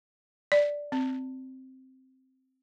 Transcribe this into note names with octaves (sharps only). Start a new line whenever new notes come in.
D5
C4